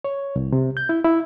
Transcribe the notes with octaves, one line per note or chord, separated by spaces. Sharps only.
C#5
C2
C3
G6
E4
E4